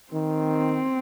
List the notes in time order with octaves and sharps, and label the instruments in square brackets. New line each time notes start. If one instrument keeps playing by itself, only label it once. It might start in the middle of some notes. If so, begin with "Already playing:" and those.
[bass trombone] D#3 [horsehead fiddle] C4